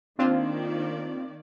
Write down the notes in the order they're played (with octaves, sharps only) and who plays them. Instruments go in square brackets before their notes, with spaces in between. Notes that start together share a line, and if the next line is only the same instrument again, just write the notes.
[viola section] D#3 A#3 D5 [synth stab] C4 D4 F4